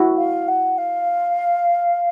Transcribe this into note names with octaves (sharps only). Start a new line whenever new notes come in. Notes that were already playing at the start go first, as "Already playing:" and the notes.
Already playing: E4 F#4
F5
F#5
F5